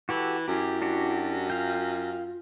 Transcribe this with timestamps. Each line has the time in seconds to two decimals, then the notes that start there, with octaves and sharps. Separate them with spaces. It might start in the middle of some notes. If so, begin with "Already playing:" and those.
0.09 E3 F#4 G4 A4
0.48 F#2 E4 G4
0.82 D4 F#4 G4
1.50 F4 F5 G5